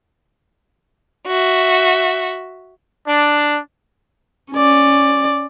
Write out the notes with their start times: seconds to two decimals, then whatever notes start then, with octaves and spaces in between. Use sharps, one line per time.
1.26 F#4 E5
3.07 D4
4.53 C#4 D5